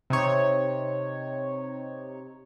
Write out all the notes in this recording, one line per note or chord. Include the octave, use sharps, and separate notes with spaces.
C3 D#4 C#5